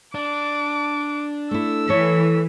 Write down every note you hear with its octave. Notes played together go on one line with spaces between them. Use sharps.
D4 D6
A3 E4 E6
E3 A4 C#5